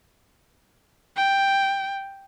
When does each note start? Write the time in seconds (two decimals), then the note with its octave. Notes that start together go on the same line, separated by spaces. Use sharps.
1.17 G5